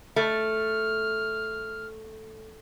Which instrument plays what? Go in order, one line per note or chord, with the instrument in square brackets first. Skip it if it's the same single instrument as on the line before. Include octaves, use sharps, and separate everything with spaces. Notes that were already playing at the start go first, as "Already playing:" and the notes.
[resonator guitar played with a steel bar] A3 [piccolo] F6